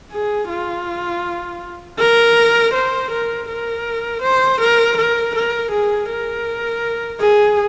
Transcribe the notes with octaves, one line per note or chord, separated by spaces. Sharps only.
G#4
F4
A#4
C5
A#4
A#4
C5
A#4
A#4
A#4
G#4
A#4
G#4